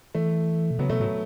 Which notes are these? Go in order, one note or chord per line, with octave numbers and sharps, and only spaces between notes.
E3 A3
B2
C#3 F#3 B3
B2 A3
A2 F#3